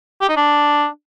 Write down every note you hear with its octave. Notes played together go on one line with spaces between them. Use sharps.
G4
D#4
D4